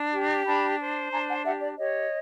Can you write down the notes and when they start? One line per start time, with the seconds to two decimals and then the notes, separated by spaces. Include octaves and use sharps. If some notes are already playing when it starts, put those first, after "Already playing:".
Already playing: D4
0.13 G4
0.46 D4 A5 B5
0.79 C5
1.12 D4 G#5 A#5
1.29 F#5 G#5
1.45 G4 E5 F#5
1.62 D5
1.79 G4 C#5 D#5